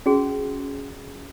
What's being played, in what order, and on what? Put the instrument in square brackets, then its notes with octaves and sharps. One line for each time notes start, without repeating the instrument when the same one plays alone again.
[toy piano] C#4 F#4 G#4